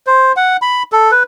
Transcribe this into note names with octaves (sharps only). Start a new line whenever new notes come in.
C5
F#5
B5
A4
B4